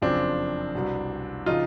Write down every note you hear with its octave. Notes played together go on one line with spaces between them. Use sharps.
F#1 F2 C#3 F3 C4 D4
C2 B2
C#3 F3 D#4 F4